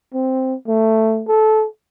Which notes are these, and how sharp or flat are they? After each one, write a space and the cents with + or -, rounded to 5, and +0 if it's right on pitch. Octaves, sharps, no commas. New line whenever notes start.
C4 +0
A3 +10
A4 -20